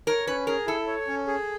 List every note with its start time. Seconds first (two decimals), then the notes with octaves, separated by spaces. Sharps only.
0.07 A#4 C#5
0.27 C#4 B4
0.47 G#4 A#4
0.67 E4 A4
0.87 C#5
1.07 C#4
1.27 G#4